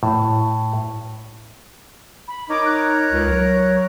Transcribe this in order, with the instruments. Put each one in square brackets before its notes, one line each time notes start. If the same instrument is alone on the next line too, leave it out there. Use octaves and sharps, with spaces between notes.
[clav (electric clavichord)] A2
[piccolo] B5
[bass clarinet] D#4 [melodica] A#4 C#5 [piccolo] D6
[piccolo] F#6
[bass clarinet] C#2
F#3